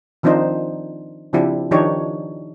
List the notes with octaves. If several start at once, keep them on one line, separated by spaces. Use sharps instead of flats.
D#3 F3 C4 D4 D#4 C5
C#3 F3 C4 D4 E4 G4
D#3 F3 D4 D#4 G4 C#5